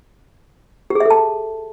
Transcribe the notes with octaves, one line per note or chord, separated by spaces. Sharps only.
G4
G#4
E5
A4
A5